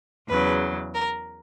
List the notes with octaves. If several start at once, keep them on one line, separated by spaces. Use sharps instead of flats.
E2 C#3 F#3 B4
A#4